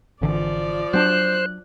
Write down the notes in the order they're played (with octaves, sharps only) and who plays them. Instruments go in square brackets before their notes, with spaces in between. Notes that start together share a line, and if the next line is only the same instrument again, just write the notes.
[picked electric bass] G#1 D3 E3 [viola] F3 D5
[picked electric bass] F#3 C#4 D4 [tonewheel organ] C5 [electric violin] F#6